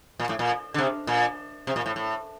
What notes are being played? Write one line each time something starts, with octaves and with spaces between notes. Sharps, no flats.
A#2
A2
A#2
D3
C3
A#2
C3
A#2
A2
A2